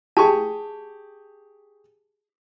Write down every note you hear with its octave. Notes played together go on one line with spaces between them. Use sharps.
G4 G#4 A5 C#6